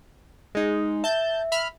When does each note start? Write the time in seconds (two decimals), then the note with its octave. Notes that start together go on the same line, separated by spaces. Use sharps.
0.55 G#3 D#4
1.04 E5 A5 G6
1.52 E5 B5 F6